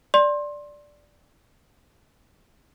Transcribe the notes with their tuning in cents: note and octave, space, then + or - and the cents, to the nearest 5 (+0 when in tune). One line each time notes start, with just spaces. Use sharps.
D5 +0 C6 +25